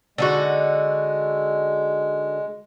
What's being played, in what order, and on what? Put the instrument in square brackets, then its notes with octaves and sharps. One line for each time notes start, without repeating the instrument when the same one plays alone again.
[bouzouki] D3 D#4 F#4 [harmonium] G#3